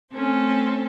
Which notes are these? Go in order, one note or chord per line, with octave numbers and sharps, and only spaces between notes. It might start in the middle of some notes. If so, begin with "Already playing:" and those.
A3 C4 C#4 A4 C5